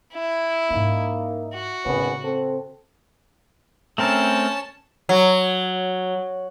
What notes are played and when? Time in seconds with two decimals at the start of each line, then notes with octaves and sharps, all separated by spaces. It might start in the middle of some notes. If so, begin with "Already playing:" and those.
0.13 E4
0.71 G#2 A#3 C#4 D#4
1.54 F#4
1.86 G#1 A2 C#3 B3 C#4
2.23 C4 A4
3.98 A3 C4 C#4 A#4 A5
5.09 F#3